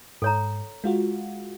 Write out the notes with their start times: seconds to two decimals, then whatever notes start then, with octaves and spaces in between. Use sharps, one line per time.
0.22 G#2 A4 C#5 A#5
0.84 G#3 F4 F#4